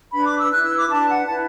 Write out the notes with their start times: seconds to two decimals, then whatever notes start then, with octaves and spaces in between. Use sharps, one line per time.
0.13 D4 B4 B5
0.25 D6
0.38 E6
0.51 E4 B4 F#6
0.64 E6
0.76 D6
0.89 D4 B4 A5
1.08 F#5
1.27 E4 B4 A5